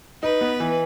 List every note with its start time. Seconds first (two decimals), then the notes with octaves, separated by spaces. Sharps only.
0.23 D#4 B4
0.41 B3
0.60 E3